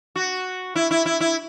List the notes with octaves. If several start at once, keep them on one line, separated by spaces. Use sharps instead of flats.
F#4
E4
E4
E4
E4